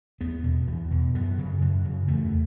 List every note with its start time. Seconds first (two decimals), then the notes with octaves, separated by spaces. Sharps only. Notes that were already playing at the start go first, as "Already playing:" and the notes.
0.21 E2 B3
0.44 B2
0.67 E2
0.91 B2
1.14 F#2 B3
1.38 C#3
1.61 F#2
1.84 C#3
2.08 E2 A3